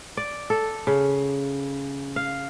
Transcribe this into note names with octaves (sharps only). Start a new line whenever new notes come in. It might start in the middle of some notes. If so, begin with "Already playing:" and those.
D5
A4
C#3
F5